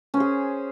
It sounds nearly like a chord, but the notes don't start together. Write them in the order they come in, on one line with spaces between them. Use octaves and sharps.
C#4 C5 G#4